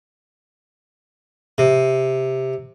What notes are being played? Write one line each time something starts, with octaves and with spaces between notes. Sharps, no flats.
C3